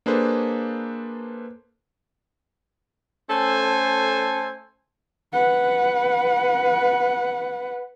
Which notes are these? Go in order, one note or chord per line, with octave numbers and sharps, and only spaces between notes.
A#3 D4 G#4 A4 B4 C5
A3 C#4 A4 C5 G#5
B4 F#5